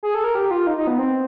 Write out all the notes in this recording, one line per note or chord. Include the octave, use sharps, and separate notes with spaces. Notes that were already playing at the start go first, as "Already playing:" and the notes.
G#4
A4
A#4
G4
F4
D#4
D#4
B3
C4